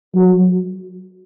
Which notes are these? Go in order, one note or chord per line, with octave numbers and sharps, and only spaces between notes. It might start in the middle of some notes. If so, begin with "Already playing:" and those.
F#3